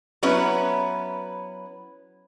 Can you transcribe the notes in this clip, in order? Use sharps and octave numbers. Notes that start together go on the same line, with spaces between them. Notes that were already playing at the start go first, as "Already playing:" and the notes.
F#3 B3 C#4 E4 B4